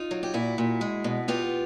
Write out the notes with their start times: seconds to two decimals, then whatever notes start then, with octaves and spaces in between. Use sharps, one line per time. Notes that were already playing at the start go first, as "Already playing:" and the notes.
Already playing: D#4 F4
0.11 F#3
0.23 G4
0.33 A#2 E4 F#4
0.58 A#2
0.81 G#3
1.04 B2
1.28 B3 F4 G4